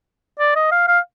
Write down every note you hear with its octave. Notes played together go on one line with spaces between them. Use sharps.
D5
D#5
F5
F5